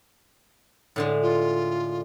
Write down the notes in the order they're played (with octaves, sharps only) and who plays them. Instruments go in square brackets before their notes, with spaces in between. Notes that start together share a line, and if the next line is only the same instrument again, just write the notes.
[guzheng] A2 D3 G#3
[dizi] F4